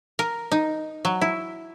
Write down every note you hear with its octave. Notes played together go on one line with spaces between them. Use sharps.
A#4
D#4
F#3
E4